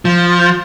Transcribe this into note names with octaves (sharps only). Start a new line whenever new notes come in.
F3